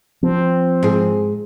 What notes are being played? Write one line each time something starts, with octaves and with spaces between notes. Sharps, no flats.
F3 C4
G#2 G#4